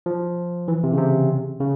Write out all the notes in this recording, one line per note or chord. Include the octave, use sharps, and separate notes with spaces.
F3
E3
C3
C#3
C3
C#3